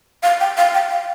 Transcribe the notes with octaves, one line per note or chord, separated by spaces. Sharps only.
F5
G5
F5
G5
F5